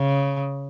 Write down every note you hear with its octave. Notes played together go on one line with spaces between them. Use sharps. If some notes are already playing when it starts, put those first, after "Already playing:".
Already playing: C#3